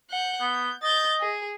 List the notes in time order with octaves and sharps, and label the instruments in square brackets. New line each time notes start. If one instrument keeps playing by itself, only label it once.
[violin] F#5 G6
[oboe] B3 [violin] G6
[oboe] D#5 [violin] G6 A6
[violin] G#4